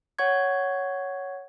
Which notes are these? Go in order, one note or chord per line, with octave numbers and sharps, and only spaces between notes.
C#5 F#5 C#6 G#6